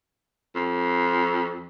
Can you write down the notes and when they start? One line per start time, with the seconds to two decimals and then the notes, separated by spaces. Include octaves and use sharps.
0.55 F2